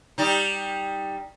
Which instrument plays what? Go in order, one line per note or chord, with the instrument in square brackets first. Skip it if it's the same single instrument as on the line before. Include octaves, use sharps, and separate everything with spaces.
[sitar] G3 D#4